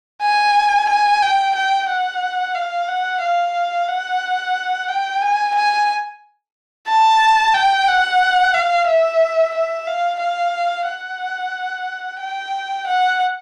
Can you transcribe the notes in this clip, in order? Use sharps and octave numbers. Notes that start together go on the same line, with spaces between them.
G#5
G#5
G5
G5
F#5
F5
F#5
F5
F#5
G5
G#5
G#5
A5
G5
F#5
F5
E5
E5
F5
F5
F#5
G5
F#5